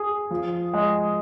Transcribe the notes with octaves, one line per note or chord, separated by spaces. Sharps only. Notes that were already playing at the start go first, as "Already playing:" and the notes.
Already playing: G#4
F3
G#3